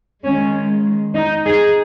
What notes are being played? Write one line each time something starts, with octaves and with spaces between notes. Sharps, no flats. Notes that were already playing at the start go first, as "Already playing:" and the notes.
D#3 G#3 C#4
D#4
D#4 G#4